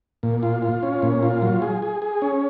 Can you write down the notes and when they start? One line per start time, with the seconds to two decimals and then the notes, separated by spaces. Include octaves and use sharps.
0.23 A#2
0.43 F4
0.62 F4
0.83 C#4
1.02 A#2
1.23 F4
1.42 F#3
1.62 G#4
1.82 G#4
2.02 G#4
2.22 C#4